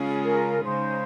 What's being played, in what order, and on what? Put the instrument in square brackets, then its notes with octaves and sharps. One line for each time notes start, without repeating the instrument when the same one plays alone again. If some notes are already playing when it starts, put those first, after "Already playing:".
Already playing: [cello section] C#3 G#3 C#4 F4 G#4
[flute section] A#4
[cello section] C#3 G#3 D#4 [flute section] C5